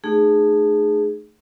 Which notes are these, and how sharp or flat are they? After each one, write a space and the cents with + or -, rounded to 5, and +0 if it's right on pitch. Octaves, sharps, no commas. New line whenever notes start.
A3 +5 D#4 -25 G#4 +0